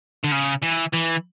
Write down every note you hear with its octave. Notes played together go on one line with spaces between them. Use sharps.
D3
C#3
E3
E3